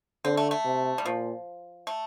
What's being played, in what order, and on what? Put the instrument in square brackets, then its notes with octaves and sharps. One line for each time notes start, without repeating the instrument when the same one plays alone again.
[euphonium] D3 [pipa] C4
[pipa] A3
A3
[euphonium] C3
[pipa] G3
[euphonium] A#2 [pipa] F3
[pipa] A3